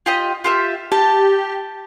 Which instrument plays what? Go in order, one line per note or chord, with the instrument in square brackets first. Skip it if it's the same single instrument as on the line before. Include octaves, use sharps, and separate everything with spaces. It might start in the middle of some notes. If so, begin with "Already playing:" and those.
[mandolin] F4 G4 D#5
F4 G4 E5
[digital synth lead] G4 [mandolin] A5